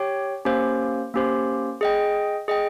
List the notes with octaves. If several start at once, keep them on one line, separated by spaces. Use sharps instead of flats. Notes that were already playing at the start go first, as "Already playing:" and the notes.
Already playing: G4 C#5 G5
A#3 C#4 G4 C5
A#3 C#4 G4 C5
G#4 D#5 G5
G#4 D#5 G5